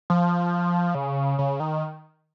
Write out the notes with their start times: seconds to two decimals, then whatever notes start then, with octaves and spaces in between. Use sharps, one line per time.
0.10 F3
0.95 C#3
1.39 C#3
1.60 D#3